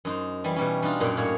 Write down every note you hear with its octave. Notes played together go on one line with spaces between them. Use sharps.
F#2 D#4 C5
E3 G3
B2 G3 C#4
G3 D4 D#4 F4
F#2 A#2
A2 A#3 G#4 C#5